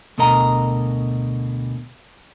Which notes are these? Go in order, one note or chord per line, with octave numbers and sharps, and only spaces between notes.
D2 B2 D3 A#4 D#5 A#5